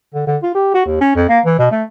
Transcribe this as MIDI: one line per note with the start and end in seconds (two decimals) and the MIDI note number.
0.14 0.26 50
0.27 0.37 50
0.43 0.50 65
0.55 0.69 67
0.74 0.85 66
0.85 0.99 39
1.01 1.11 61
1.15 1.27 41
1.29 1.40 58
1.45 1.58 52
1.59 1.69 47
1.71 1.83 57